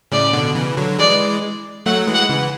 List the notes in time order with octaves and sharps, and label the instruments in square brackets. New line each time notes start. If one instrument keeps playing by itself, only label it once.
[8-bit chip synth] A2 C#3 [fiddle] D5
[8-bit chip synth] B2 D3
C#3 E3
D3 F#3
[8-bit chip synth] E3 G#3 [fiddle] D5
[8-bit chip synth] F#3 A3 [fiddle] F#5
[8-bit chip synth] E3 G#3
[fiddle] F#5
[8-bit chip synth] C#3 E3